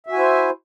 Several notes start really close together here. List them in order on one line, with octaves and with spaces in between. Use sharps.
E5 F#4 G#5 E4 C5